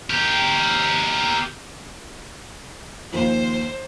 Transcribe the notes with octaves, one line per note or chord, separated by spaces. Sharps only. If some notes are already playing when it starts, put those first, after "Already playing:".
G4 A#4
D#2 F3 C5